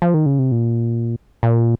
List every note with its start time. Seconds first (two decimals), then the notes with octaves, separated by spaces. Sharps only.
0.02 F3
0.14 D#3
0.26 C#3
0.39 C3
0.52 A#2
1.43 A#2